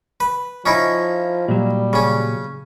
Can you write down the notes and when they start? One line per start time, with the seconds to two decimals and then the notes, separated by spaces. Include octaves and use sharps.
0.20 B4
0.66 F3 C#4 D#4 E4
1.48 A#2 F#3 G3
1.93 C#3 C#4